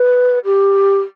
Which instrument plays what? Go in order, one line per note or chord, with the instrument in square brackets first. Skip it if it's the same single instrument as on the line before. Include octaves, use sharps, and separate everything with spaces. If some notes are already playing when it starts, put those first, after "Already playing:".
Already playing: [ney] B4
G4